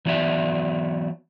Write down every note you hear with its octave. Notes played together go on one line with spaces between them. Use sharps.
E3 F#3 B3 D5 E5